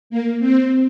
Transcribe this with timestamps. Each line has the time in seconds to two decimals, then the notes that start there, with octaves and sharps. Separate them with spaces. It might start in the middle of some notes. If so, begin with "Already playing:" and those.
0.10 A#3
0.40 C4